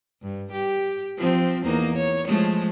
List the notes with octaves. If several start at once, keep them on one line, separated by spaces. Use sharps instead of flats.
G2
G4
F3 C4
E2 A#3 D#4
C#5
F3 G#3 A3